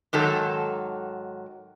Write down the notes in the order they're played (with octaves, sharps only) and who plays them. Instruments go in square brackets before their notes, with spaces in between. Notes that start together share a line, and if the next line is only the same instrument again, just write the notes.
[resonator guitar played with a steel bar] G#2 D#3 F#3 A4